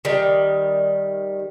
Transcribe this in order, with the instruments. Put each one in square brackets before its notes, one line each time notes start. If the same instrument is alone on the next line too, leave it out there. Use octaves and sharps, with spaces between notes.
[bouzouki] D#3 G3